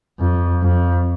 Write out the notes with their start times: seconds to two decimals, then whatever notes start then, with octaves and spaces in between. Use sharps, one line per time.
0.20 F2
0.62 F2